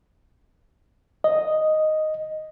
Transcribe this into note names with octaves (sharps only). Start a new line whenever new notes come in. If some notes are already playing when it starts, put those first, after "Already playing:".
D#5